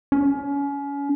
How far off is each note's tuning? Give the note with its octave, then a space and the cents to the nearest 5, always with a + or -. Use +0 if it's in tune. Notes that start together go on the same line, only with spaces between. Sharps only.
C#4 +30